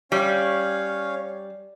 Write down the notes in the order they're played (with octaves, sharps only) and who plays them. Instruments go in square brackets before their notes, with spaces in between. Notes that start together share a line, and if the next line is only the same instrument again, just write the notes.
[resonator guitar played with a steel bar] G3 [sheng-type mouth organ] C#4 C#5 F5